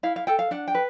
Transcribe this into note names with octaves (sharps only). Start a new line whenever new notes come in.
E4 F5
F5
A4 G5
F5
D4 F#5
G5
B4